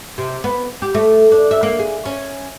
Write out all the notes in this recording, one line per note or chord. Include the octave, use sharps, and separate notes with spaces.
C3
B3
G4
A3
D4
E5
A#3
G#4
C#4